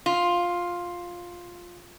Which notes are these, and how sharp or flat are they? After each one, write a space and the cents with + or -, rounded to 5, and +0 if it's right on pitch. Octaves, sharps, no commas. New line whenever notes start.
F4 +5